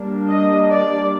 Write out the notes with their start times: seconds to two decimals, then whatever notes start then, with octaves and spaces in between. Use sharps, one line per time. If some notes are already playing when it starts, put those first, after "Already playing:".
Already playing: G3 A#3 D4
0.30 D#5
0.70 D5